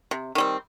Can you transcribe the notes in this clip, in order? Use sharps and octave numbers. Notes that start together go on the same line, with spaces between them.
C3
D#3 G3 C4